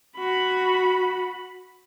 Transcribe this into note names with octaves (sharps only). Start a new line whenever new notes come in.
F#4 B5